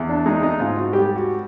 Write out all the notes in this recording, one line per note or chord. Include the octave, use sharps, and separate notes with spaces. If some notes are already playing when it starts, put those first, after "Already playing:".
Already playing: E2
D4
G#3 D#4
D#4
G#2 F4
F#4
G3 G4
F#4